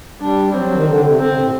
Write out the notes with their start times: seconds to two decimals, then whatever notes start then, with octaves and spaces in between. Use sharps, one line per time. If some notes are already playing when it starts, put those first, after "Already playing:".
0.20 G3 D4
0.53 F#3 C4
0.64 F#3
0.75 D#3
0.86 D3
1.03 C3
1.19 D3 C4
1.29 C3
1.41 A2